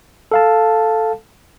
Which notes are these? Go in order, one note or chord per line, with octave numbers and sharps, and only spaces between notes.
A4 F5 A5